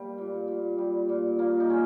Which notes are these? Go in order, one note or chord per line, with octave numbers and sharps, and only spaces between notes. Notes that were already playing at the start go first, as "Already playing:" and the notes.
Already playing: G3 A#3
A#2
A#2
G3
A#2
A#2 A#3
D#4
G#3 C#4